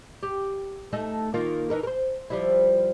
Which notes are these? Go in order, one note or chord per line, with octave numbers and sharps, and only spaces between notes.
G4
A3 D#4 A4
D#3 A#3 F4
E3 D#4 A#4
A#4 C5
F3 G3 E4